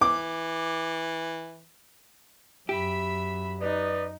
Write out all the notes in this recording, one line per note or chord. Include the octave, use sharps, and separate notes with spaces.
E3 D6
F#2 G4 E5 B5
D#4 B4 D5 D#5